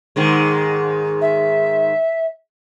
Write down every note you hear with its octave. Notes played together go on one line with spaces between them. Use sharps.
G#2 D#3 G#3
E5